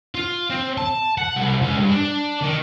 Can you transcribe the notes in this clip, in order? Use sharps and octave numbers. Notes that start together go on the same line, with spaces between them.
F4
C4
A5
F#5
C2
C#2
G2
D4
D#3